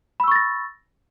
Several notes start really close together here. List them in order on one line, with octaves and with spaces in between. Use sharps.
B5 E6 C#6 A6 A#6